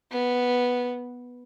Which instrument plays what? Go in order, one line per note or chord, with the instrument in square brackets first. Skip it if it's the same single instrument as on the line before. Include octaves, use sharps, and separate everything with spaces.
[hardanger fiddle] B3